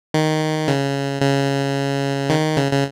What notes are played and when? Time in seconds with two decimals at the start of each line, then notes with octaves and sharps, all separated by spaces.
0.14 D#3
0.68 C#3
1.21 C#3
2.30 D#3
2.56 C#3
2.72 C#3